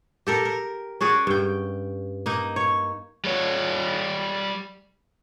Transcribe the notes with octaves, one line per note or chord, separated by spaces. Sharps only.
G4 A4 A#4
A#4
C#4 F#4 G#4 D5
G2 G5
A#3 D#4
C#5
G3 C#5